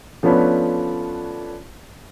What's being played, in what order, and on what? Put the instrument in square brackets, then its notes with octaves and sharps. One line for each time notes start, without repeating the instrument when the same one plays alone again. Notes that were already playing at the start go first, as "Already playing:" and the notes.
[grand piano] F3 A3 B3 C#4 D4 B4